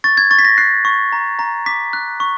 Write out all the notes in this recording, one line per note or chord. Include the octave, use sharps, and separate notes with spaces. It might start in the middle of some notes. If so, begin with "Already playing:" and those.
C#6 A6
G#6
C#6 A6
B6
A#6
F#6 C7
C#6
A#5
A#5
D6 B6
F#6
C#6